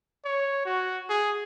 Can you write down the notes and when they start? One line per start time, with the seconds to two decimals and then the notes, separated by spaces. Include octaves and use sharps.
0.25 C#5
0.66 F#4
1.10 G#4